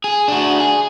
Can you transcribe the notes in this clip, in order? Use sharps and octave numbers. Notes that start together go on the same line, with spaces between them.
G#4
D4 F#4
G#4